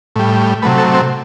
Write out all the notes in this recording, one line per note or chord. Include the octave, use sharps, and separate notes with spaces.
A2 G3
C3 F#3 A3 B4
A4
C4